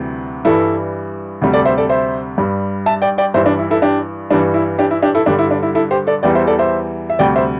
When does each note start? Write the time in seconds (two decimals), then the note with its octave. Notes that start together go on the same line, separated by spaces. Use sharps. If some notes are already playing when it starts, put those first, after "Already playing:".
Already playing: D2 C3 E3 G3
0.45 G2 E3 G3 E4 A4
1.41 D2 C3 G3
1.53 A4 D5
1.65 C5 E5
1.78 A4 D5
1.89 C5 E5
2.38 G2 G3
2.86 E5 A5
3.02 D5 G5
3.18 D5 G5
3.34 G2 E3 G3 C5 E5
3.46 D4
3.59 E4
3.71 E4 A4
3.82 D4 G4
4.30 G2 E3 G3 D4
4.54 E4
4.79 D4 G4
4.91 E4
5.03 D4 G4
5.15 E4 A4
5.26 G2 D3 G3 D4 G4
5.39 E4
5.51 D4
5.63 E4
5.75 E4 A4
5.91 G4 C5
6.07 A4 D5
6.23 E2 E3 G3 D5 G5
6.35 C5 E5
6.47 A4 D5
6.59 C5 E5
7.10 E5
7.19 D2 C3 G3 D5 G5
7.36 C5 E5